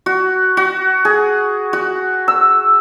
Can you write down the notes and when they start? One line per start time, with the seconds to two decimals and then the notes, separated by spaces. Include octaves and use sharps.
0.06 F#4
0.57 F#4
1.05 G#4
1.73 F#4
2.28 E6